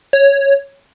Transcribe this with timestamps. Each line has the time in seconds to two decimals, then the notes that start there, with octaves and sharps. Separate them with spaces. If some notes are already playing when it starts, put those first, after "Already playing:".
0.13 C#5